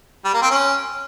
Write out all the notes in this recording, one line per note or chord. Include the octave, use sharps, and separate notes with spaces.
G3
A#3
C4
C#4